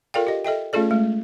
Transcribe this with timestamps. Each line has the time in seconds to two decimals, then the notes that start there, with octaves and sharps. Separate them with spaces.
0.14 F4 A4 A#4 D5 F5 G5
0.27 G4 D#5
0.44 A4 D#5 E5 G5
0.73 A3 C#4 F4 G#4 A4 D5
0.91 G#3 A3